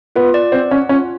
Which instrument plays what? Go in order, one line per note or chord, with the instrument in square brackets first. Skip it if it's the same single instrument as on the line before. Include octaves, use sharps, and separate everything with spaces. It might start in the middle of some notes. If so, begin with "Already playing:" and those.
[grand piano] B3 [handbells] F4
[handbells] D5
[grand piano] C4 [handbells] F#5
[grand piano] C#4 [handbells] F#5
[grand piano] C#4 [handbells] F4